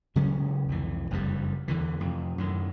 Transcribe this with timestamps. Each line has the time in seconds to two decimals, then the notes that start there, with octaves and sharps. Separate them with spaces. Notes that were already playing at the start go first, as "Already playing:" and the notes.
0.16 C#3 F#3 G#3 C#4
0.68 C2 F2 E3
1.11 F#1 F2 C#3 G3
1.68 E2 D3 E3
2.00 F2 C3
2.38 F#2 A2 D#3